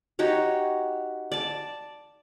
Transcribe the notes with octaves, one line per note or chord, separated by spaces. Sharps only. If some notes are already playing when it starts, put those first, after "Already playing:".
D#4 F#4 G4 C#5
D5 A5